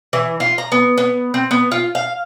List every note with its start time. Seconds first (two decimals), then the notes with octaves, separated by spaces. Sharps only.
0.13 E3
0.40 F4
0.58 A#5
0.72 B3
0.98 B3
1.34 C4
1.51 B3
1.71 F4
1.95 F5